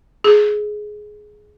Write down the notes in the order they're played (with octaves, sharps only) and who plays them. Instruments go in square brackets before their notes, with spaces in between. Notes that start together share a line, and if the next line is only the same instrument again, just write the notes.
[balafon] G#4